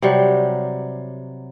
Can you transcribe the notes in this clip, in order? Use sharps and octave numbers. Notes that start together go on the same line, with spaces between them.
C3 F#3 G3